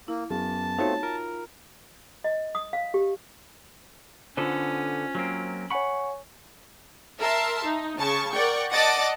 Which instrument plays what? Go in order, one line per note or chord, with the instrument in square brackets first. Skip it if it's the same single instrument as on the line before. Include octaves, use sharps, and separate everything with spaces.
[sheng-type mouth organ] A#3 [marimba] E4
[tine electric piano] F#2 [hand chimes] B3 G#4 [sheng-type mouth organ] A5
[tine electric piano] A3 C4 F4 [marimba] D#4 F#4 C#5
[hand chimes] F4 [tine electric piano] A#4
[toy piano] D#5
D#6
F5
G4
[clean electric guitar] D3 B3 A4 [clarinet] C#4 [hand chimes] F4 C5
[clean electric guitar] F#3 A#3 C4
[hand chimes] C#5 G#5 C#6 [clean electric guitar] F#5 B5
[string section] A#4 E5 A5 C6
D#4
C#3 A5 C#6
A#4 D5 F#5 G5 C#6
D5 D#5 F#5 A5 D6 A6